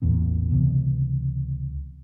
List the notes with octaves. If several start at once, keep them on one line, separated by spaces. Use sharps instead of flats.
A1 E2 A#2 C4
C#2 C3 E3 B3